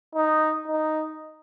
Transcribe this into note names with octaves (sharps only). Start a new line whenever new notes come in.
D#4
D#4